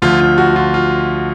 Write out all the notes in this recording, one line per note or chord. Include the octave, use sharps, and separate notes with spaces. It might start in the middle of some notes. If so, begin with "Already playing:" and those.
D2 D3 F3 F4
F4
F#4
F4
F4